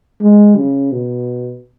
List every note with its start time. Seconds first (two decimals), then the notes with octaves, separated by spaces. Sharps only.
0.22 G#3
0.57 C#3
0.92 B2